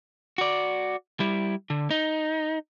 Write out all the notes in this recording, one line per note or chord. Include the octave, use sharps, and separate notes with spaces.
F#4 D5
G3 E4
D3
D#4